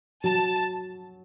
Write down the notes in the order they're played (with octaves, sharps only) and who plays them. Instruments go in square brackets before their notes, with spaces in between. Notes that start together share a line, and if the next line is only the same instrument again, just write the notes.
[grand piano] F#3 [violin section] A5